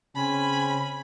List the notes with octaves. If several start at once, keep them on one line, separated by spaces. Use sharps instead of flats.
C#3 C4 C#4 G#5 B5